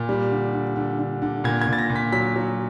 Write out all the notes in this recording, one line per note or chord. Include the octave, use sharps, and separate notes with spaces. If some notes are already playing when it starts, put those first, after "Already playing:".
Already playing: A#2
G3
D3
D3
D3
D3
D3
A#2 G#6
G#6
A#2
A6
A#6
A#2
B6
F#3 B6
F#3